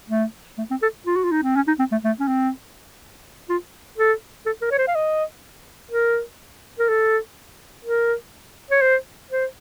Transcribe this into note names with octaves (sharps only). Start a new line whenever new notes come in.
A3
A3
C4
A4
F4
F#4
F4
D#4
C4
C#4
D#4
C4
A3
A3
C#4
C4
F4
A4
A4
A#4
C#5
C5
F5
D#5
A#4
A#4
A4
A#4
C#5
C5
C5